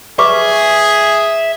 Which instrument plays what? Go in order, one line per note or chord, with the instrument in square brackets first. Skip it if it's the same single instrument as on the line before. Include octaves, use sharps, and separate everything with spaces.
[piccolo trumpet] G#4 [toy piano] B4 C#6 D6 [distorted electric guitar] E5